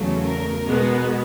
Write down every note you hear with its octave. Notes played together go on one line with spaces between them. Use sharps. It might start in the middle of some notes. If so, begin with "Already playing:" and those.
Already playing: E2 C#3 F#3 A3
A#4
B2 G#3 B3